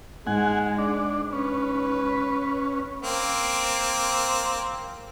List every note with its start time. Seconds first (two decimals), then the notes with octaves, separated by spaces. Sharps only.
0.27 G#2 G#3 F#5 G#5
0.78 D4
1.33 C#4 B4
3.03 A#3 C4